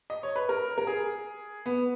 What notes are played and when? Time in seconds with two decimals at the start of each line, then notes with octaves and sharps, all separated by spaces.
0.10 D#5
0.23 C#5
0.36 B4
0.49 A#4
0.78 A#4
0.87 G#4
1.66 B3